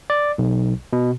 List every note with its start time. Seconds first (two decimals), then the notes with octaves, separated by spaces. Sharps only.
0.10 D5
0.38 B1
0.93 B2